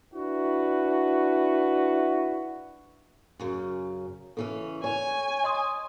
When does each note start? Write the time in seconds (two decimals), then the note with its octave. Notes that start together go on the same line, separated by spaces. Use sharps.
0.15 D4 E4 F#4 B4
3.39 F#2 C#3
4.37 C#3 E3 C#4 A4
4.84 C#5 G#5
5.44 D#5 C6 D#6